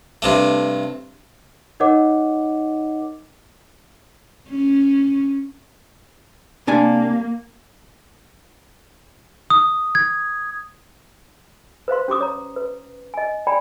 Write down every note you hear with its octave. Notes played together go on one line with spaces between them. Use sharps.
G2 C3 A3
D#4 A#4 C#5 D#5 F#5 D6
C#4
C3 A#3 D4 G#5
D#6
G#6
B4 C5 F5 C6
C#4 G4 C6 D6 D#6
C#5 A#5
B4
D#5 G#5
D5 G5 G#5 A#5 B5